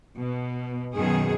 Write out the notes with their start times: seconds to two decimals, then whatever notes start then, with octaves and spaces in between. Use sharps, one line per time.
0.18 B2
0.95 F#2 B2 D#3 G#4